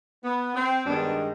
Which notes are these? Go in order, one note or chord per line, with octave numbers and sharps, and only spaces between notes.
B3
C4
G2 D#3 G#3 B3 D4